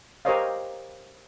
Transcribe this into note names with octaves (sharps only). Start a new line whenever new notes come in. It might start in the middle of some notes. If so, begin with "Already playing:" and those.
G4 A#4 C5 C#5 D#5 F5